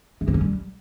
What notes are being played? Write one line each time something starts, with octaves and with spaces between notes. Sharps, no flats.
G#3
C4
C#4
G3